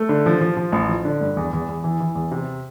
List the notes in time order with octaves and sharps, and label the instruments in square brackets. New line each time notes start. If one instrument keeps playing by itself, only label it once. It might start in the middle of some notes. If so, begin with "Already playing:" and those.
Already playing: [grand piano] A3
D3
F3
F3
F3
A1
F3
D3
G2
E2
E2
E2
E3
E3
E2
C3